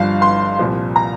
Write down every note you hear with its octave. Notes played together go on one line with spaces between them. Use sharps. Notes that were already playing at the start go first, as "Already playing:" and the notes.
Already playing: G1 G2 F3 F5
C6
C2 A#2 F3
A#5